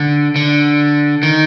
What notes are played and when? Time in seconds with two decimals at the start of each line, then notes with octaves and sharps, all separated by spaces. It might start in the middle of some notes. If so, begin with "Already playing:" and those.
Already playing: D3
0.36 D3
1.23 D#3